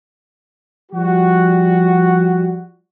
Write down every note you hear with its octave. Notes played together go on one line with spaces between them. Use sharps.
F3 G3 F#4